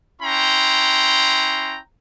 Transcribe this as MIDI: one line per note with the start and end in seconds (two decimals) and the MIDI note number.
0.22 1.79 61
0.22 1.79 64
0.22 1.79 79
0.22 1.79 82
0.22 1.79 84